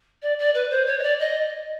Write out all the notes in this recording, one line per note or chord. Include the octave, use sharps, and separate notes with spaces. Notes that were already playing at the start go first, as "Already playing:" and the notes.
D5
D5
B4
C5
C#5
D#5
D5
D#5